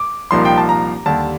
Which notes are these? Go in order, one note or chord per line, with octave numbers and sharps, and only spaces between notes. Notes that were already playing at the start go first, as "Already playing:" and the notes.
Already playing: D6
C2 A#2 F3 A#3 D#4 C6
G5
A5
A#5
D#2 D3 G3 A5